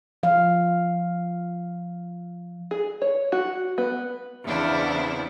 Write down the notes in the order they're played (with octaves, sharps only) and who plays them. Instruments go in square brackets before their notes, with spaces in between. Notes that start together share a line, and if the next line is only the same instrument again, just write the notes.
[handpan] F3 F5
[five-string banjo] G#4
C#5
F#4
B3
[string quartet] E2 C#3 B3 C4 D4 E4